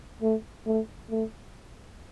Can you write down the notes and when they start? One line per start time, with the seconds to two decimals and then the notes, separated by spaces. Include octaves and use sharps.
0.22 A3
0.66 A3
1.10 A3